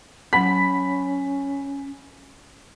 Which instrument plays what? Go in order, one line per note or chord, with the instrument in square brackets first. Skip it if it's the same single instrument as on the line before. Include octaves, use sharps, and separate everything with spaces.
[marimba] F#3 F#5 [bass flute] C#4 [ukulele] B5 [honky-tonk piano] B6